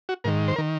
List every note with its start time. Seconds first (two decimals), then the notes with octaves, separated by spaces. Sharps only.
0.09 F#4
0.24 G#2 D#3 A#4
0.48 C5
0.56 A#4
0.58 D#3